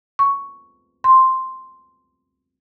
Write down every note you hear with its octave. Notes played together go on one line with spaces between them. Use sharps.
C#6
C6